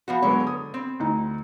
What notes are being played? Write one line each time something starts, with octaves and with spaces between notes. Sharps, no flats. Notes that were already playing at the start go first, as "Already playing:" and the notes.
F3 B3 F#4
D3 F#3 G#3 B3 C#5
D#6
C4
D2 D#4